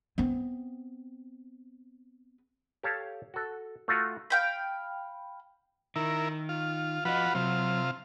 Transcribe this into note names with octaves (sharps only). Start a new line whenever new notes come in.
B3 C4
G4 A4 C#5 F5 A5
F#4 A4
A3 F4 F#4
F5 G5 B5
D#3 E4 A#4
F4
F3 F4 F#4 B4 D#5
C3 F#3 F4